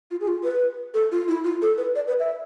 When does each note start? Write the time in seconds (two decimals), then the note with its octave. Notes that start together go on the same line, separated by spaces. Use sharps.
0.11 F4
0.21 G#4
0.28 F4
0.44 B4
0.94 A4
1.12 F4
1.28 E4
1.44 F4
1.62 A4
1.78 B4
1.95 D5
2.07 B4
2.20 E5